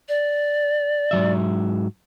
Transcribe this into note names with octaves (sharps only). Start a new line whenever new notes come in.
D5
G#2 F#3 E5